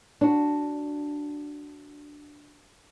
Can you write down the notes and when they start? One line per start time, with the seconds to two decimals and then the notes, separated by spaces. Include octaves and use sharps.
0.21 D4 F#4